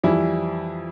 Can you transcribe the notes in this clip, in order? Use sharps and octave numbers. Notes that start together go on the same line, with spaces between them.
F2 E3 G3 E4